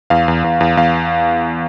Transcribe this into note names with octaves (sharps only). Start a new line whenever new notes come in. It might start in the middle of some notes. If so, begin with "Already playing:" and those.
E2 F5
E2
E2
E2
E2 F5